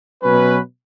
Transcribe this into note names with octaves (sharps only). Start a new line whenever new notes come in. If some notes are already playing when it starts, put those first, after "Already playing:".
B2 F#3 C#4 B4